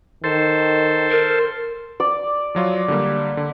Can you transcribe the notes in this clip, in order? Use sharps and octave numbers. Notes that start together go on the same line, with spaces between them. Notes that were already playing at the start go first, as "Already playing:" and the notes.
D#3 A4 C5
A#4
D5
F3 F#3 F4
D3 G3 A#3
D3